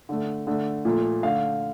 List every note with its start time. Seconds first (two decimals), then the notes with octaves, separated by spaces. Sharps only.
0.09 D3 A3
0.47 D3 A3
0.85 A#2 F3 A3
1.23 D3 A3 F5